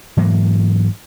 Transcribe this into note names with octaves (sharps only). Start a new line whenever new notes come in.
G#2 E3 F#3 A#3